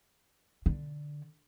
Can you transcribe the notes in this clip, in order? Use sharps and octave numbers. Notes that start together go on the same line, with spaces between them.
D3